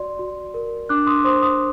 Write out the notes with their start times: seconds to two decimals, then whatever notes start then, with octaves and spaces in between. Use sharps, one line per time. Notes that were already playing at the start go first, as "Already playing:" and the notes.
Already playing: F#4 D5 C6
0.19 F#4
0.54 A#4
0.89 D4 D6 F#6
1.07 C6 D#6
1.24 C5 C6 D#6
1.42 C6 D#6